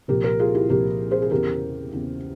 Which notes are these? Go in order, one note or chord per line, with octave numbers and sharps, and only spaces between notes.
C2 A#2 F3 G4 A#4
G4 A#4
F4 G#4
E4 G4
C2 A#2 F3 G4 A#4
G#4 C5
G#4
E2 C#3 E3 G4 A#4
E2 C#3 E3